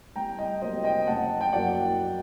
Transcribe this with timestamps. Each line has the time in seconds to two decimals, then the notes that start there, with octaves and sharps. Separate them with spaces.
0.16 C2 G5 A#5
0.38 D#5 G5
0.61 C3 F#3 A#3 C5 D#5
0.84 D#5 G5
1.07 F#1 F#5 A5
1.41 G5
1.52 F#2 F#3 A#3 D5 F#5